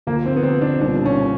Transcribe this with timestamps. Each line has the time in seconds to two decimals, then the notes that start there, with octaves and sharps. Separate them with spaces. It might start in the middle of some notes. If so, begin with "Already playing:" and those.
0.07 D2 D3 F3 A#3
0.26 C4
0.36 B3
0.43 C4
0.61 D4
0.80 C2 A#2 G3 B3 D4
1.06 C#4